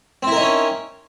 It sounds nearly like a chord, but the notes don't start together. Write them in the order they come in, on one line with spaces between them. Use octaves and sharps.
C4 E4 A#4 D#4 C#4